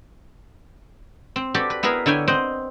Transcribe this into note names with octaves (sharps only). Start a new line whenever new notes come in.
C4
F#4 G4 A4 B4 D5
B4
B3 E4 G#4 A#4 B4
D3 E4 C#5 G5 G#5
C4 C5 D#5 F#5 G5